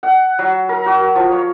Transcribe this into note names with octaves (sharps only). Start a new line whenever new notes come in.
F#5
F#3
A#4
F#4
F3
C#5